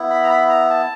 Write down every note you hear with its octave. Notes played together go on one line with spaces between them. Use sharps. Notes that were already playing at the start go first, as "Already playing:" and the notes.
Already playing: B3 E4
B5
A#5
B5
A#5
A5